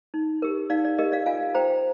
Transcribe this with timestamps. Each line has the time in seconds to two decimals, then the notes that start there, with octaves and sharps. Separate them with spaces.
0.14 D#4
0.42 G4 A#4
0.70 D#4 D5 F5
0.85 D5
0.98 G4 A#4 D#5
1.12 D5 F5
1.26 F4 F5 G#5
1.54 C5 G5 A#5